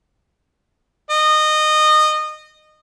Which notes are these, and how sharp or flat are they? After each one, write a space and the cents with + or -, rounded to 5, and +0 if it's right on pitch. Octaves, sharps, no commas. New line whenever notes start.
D#5 -20